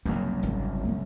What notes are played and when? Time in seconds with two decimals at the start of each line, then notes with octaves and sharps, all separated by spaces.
0.05 F#1 C2 F#2 A#3 D4
0.43 G#1
0.85 G#2 D#3